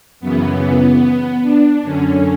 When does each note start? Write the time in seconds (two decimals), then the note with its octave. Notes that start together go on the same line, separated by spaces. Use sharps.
0.20 F#2 C#3 E3 B3
1.42 D4
1.83 F#2 D3 C#4